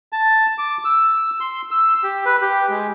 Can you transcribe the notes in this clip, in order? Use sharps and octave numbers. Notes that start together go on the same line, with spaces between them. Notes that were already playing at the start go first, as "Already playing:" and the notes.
A5
D6
E6
C6
E6
G4
B4
G4
G#3